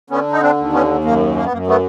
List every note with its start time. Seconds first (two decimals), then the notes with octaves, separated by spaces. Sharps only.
0.10 D3 B3 C#4
0.32 D#4
0.42 C4 D4
0.57 D#2
0.73 B3 C#4
1.04 F#2 A#3
1.36 A#3
1.44 B3
1.52 F#2 A#3
1.67 A3 B3